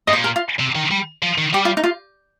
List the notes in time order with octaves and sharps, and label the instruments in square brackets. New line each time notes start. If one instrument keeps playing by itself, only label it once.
[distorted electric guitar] G2 [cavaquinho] D#5
[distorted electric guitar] A#2 [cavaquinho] C5
[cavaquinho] A#4
F4
[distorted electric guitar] C3
D#3
G3
F3
D#3
[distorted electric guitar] G3 [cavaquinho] G4
[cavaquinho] F4
D#4
F4